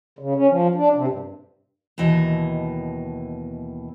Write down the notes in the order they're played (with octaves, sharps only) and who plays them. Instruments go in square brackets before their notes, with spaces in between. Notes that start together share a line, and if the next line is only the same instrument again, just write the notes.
[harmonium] C#3
C#4
F3
D4
C3
G2
[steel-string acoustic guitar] D#2 B2 E3 D#5